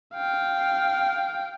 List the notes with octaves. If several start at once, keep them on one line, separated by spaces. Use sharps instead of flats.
F5 G5